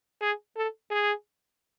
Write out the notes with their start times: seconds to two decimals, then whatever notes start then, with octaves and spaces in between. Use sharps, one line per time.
0.21 G#4
0.56 A4
0.91 G#4